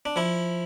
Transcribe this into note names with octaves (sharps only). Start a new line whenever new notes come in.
D4
F3 E4